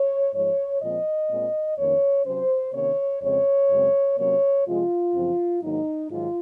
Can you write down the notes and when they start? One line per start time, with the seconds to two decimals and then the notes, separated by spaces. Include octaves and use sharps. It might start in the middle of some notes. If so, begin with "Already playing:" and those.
Already playing: C#5
0.34 G#2 F3 G#3 C#5
0.81 A#2 F3 G#3 C4 D#5
1.29 A#2 G#3 C4
1.77 F2 D#3 A#3 C#4 C#5
2.26 C3 F#3 C#4 C5
2.73 C3 D#3 A#3 C#4 C#5
3.22 F2 C#3 G#3 C4 C#5
3.70 F#2 C#3 G#3 C4
4.18 C3 F#3 A#3 C#4 C#5
4.66 C3 F3 G#3 F4
5.14 F#2 C#3 F3 C4
5.62 G#2 D#3 F#3 A#3 D#4
6.10 G#2 D#3 F#3 F4